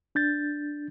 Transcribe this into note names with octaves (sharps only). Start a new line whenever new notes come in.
D4 G6 A6